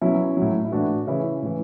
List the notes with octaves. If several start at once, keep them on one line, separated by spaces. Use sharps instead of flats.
B2 F#3 C#4 E4
A2 F#3
E4
A2 E3 D4 F#4
C#3 E3 C#4 E4
A2 E3